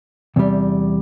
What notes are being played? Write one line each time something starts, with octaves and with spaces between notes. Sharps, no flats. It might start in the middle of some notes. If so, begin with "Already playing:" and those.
E2 C3 G3